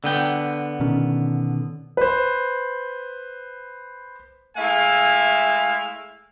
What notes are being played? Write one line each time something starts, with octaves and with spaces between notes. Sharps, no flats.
D3 B3 G5
B2 D#3 C#4
B4 C5
G#3 A3 E4 E5 F5 G#5